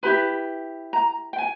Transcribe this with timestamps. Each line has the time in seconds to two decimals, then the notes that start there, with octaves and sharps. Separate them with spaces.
0.03 E4 G4 B4 B5
0.93 A#5
1.33 G5
1.38 G#5